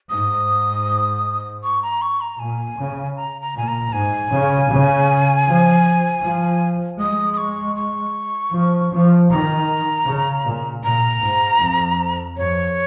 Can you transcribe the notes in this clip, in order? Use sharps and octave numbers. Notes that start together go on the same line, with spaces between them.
G#2 D#6
C#6
A#5
C#6
A#5
A#2 G#5
C#3
A#5
A#5
A#2 G#5
A#5
G#2 G#5
C#3
C#3
F3
F3
G#3 D#6
D#6
C#6
C#6
F3
F3
D#3 A#5
C#3
A#2
A#2 A#5
G#2
F2
F2 C#5